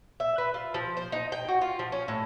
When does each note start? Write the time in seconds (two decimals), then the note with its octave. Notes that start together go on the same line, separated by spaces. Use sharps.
0.20 E5
0.38 B4
0.54 F4
0.74 F3
0.97 C5
1.12 D#4
1.32 G5
1.48 F#4
1.61 F4
1.79 F3
1.92 C#4
2.08 A2